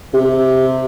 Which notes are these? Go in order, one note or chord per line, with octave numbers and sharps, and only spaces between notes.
C3